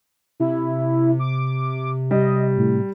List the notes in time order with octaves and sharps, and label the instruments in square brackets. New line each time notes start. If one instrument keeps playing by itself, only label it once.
[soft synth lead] C3 [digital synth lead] E4
[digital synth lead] D6
[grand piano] G3 [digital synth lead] D#5
[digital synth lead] A2